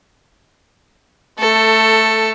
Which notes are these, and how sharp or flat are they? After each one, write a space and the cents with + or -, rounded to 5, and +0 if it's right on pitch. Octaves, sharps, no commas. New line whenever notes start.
A3 +0 A4 +15